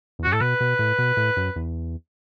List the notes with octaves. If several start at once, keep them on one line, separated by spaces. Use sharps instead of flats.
E2
F#2 F#4
A2 A4
B2 B4
B2
A2
B2
A2
F#2
E2